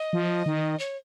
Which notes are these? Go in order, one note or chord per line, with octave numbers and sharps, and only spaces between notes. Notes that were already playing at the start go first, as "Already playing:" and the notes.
Already playing: D#5
F3
D#3
C#5